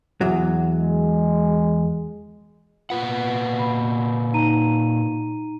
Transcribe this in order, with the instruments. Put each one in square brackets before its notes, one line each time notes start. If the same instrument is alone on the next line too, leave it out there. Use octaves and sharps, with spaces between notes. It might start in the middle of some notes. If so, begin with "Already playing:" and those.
[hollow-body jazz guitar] E2 F#3
[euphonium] G#3
[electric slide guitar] A#2 B4 F#5 [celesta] F4
[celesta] B5
D#4 A#5 D#7